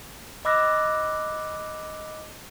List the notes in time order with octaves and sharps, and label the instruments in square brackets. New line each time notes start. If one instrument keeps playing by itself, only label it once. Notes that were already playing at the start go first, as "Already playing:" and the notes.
[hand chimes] D#5 B5 D6 E6 F#6 A#6